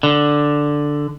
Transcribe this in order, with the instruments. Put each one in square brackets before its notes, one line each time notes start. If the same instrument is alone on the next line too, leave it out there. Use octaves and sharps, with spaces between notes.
[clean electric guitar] D3